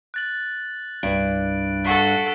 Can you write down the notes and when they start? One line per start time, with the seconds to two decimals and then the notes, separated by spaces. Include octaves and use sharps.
0.14 F#6 A6 F#7
1.03 C2 G2 D7
1.84 F#4 A4 F#6 B6 C7